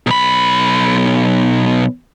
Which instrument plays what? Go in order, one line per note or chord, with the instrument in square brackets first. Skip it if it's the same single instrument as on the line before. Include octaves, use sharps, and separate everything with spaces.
[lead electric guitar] B1 B5